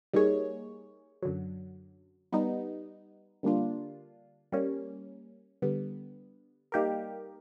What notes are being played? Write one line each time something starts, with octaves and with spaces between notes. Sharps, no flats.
G3 A#3 D#4 G#4 C#5
F#2 D3 F#3
G3 B3 D#4
D3 G3 A#3 D4 F4
G3 A#3 C#4
D3 G3 B3
G3 A#3 D#4 G4 A#4